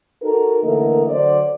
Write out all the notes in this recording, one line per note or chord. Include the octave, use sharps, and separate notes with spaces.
D#4 F#4 A4 A#4
D3 E3 A3 A#3 A#4 D#5
D3 F#3 C5 D5